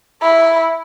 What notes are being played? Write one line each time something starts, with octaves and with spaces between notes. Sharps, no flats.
E4